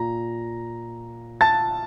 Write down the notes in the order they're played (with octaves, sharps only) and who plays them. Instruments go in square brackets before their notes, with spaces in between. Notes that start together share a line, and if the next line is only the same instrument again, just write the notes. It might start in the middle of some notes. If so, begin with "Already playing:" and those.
Already playing: [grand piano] A#2 A#5
A5 A6